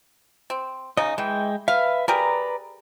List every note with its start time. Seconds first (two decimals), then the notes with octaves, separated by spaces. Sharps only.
0.50 C4
0.97 C#3 D#4 D#5
1.18 E3 G#3 G5
1.68 B4 E5 F5
2.08 G4 G#4 A#4 B4 D5 A#5